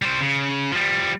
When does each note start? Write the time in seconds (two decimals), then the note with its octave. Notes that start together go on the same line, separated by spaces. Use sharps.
0.02 G3 C5
0.21 C#3
0.72 F3 G3